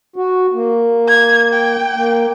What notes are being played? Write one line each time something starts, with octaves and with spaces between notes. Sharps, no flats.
F#4
A#3
G#6
G5
A#3